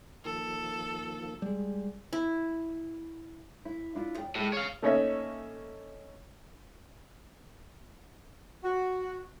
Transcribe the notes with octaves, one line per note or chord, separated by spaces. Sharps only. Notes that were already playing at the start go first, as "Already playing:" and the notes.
D#3 F3 A#3 A4
G3 G#3
E4
E4
D4 E4 F4
D5 G5
A2 G#3 G4
C#5 F5
A3 A#3 C#4 D#4 C#5 E5
F#4